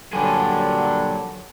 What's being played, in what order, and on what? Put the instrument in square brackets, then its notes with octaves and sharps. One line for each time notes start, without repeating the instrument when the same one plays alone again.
[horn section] G2 A#2 D3 [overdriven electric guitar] F#3 G#5